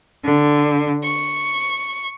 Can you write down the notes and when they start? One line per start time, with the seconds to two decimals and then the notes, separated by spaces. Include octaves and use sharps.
0.23 D3
1.03 C#6